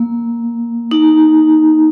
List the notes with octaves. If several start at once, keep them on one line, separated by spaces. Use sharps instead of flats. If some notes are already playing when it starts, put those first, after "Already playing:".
Already playing: A#3
D#4